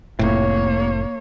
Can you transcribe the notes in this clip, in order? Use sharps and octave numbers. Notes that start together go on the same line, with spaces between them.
F1 A2 A#3 C#5